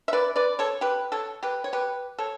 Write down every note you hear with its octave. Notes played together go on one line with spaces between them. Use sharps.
E5
B4 D5
B4 D5
A4 C#5
G4 B4
A4 C#5
G4 B4
C#5
G4 B4
A4 C#5